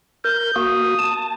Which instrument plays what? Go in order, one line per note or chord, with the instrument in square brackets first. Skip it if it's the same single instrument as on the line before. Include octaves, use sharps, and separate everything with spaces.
[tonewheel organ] A#4 [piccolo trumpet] G6
[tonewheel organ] A#3 F#4 [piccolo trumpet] D#6
[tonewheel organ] A5